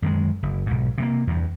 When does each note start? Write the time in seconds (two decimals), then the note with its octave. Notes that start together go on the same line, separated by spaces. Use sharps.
0.02 F#2 D#3 G3 G#3
0.43 F#1
0.66 B1 G#2
0.98 C3 G#3 A#3
1.27 E2 G2